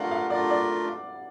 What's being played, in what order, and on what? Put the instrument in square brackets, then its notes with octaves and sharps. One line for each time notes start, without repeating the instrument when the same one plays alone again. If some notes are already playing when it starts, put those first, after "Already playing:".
Already playing: [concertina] A3 D4 F4 A#4 [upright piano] F5 F#5
[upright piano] F5
[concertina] A3 D4 F4 A#4 [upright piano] D5
[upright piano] D5